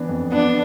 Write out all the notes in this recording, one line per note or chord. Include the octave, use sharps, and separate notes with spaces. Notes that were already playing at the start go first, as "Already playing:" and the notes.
Already playing: E3 B3 D4
F2
B3 D4